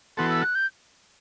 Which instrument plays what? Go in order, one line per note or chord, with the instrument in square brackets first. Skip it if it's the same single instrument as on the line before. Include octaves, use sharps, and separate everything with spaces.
[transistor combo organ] E3 B3 F#4 A4 [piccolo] C6
[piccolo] E6
F#6
G6